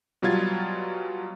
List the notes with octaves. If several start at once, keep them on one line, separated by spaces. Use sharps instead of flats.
B2 F#3 G3 F4 G#6 A6